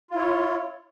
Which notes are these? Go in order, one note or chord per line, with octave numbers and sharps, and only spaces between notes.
E4 F4 C#5